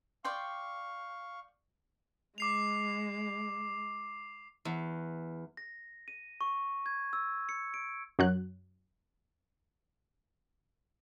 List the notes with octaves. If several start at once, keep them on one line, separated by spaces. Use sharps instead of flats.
D5 F5 G5 C6 C#6
G#3 D6 C7 F7
E2
A#6
D#7
C#6
G#6
E6
C#7
D7
F#2 F#3 F#6